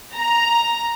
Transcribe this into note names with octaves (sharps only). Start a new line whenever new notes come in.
A#5